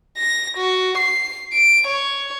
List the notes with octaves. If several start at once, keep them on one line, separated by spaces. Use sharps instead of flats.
A#6
F#4
C7
D7
C#5